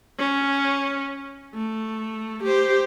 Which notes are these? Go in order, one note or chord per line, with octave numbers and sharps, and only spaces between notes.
C#4
A3
G4 C5